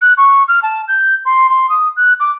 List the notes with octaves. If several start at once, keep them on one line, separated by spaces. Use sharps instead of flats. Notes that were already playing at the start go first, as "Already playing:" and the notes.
F#6
C#6
F6
A5
G6
C6
C6
D#6
F#6
D6